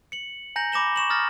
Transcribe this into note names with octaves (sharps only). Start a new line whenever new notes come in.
C#7 F#7
G#5 A#5 G6 A#6 C#7 F#7
B5 D6 A#6 E7 G7
C#6 E7 F#7
A#5 D#6 F6 A6 A#6